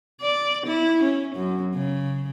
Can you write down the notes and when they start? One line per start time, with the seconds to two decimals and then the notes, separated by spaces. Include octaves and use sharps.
0.21 D5
0.66 E4
1.03 C#4
1.35 F#2
1.74 C#3